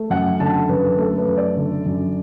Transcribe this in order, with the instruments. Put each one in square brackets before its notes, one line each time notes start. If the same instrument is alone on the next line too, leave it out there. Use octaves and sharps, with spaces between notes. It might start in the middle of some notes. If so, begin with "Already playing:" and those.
Already playing: [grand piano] A3
F#2 F#5
D3 A5
F#2 B4
A3 A4
B4
F#2
D5
D3
F#2